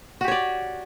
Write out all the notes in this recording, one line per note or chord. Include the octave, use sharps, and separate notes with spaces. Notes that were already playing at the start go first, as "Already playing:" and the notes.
F#4 G4 C#5 D5